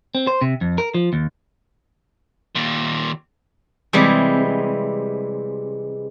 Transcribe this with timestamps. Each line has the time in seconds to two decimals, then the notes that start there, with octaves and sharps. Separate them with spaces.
0.15 C4
0.27 C5
0.42 C3
0.61 F2
0.78 A#4
0.94 F3
1.13 D#2
2.55 D#2 A#2
3.93 C3 E3 G3 G#3